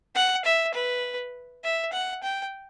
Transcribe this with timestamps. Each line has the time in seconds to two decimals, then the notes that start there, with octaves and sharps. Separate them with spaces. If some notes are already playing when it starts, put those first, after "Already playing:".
0.15 F#5
0.45 E5
0.75 B4
1.64 E5
1.93 F#5
2.23 G5